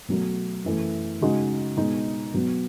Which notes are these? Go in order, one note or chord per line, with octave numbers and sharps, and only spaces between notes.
B2 F#3 A3
F#2 E3 A3
C#3 G#3 D#4 F#4
B2 G#3 D#4
B2 F#3 B3